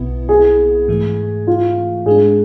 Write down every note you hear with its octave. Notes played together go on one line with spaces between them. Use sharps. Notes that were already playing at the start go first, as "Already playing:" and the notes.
Already playing: B1 B2 B3 E4
G#4
G#2 E3 A3
F4
G#2 G#3 D4 G#4